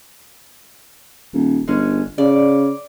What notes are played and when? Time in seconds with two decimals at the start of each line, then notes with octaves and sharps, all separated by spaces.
1.33 D#1
1.68 G1 G#3 C#4
2.18 C#3 D5